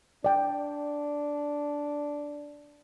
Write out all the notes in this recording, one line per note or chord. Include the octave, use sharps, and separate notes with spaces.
D4 D5 G5